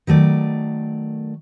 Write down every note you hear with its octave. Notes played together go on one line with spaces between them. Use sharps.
D#3 F#3 A3 D5